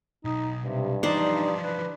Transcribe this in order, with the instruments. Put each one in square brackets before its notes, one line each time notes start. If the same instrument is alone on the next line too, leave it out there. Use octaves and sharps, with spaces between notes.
[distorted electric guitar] B1 [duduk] D#4
[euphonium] G2 [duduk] C3
[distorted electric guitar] E3 F3 [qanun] D4 C5 [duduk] D#4
[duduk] B4